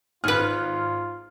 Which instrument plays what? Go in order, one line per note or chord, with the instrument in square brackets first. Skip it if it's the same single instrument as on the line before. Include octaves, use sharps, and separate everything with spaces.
[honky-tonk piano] G#1 F6 [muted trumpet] F4 [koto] G#4 B4